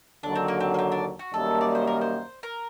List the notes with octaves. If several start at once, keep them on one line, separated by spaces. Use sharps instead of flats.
D#2 D3 F#3 D4
C4
A#3
C4
A#3
C4
D4
F#4
F#2 D#3 G3 A#3 A4
D5
C5
A#4
C5
A#4